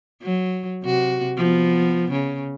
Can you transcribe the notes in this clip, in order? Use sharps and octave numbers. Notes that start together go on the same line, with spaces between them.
F#3
C3 F#4
F3 B3
C#3